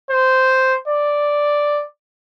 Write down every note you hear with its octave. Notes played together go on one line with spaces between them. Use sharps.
C5
D5